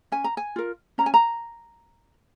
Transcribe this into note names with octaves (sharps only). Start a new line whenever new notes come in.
C#4 G#5
A#5
G#5
F4 A#4
C#4 A#5
G#5
A#5